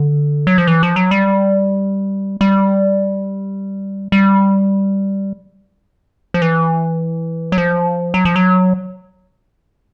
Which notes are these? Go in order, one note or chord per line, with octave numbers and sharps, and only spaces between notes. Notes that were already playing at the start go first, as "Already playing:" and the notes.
Already playing: D3
F#3
F3
E3
F3
F#3
G3
G3
G3
F3
E3
F#3
F3
F#3
F3
F#3